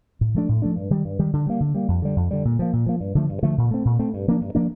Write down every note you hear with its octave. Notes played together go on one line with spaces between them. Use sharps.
A2
F3 A3 D4
A2
F3 A3 D4
G2
D#3 G3
G2
D#3 G3
D3
G3 A#3
D3
G3 A#3
F2
D3 G3
F2
D3 G3
A#2
F3 A#3
A#2
F3 A#3
G2
D3 F3 A3
G2
D3 F3 A3
A#2
A3 C4
A#2
A3 C4
G2
F3 A#3 D4
G2
F3 A#3 D4